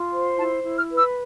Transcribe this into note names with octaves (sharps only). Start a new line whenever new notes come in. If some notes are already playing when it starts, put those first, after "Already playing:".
Already playing: F4
C5
E4 A5
E4
F6
B4
E6